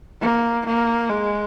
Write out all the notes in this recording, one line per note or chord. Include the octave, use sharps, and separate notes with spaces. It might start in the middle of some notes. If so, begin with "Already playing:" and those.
A#3
A#3
G#3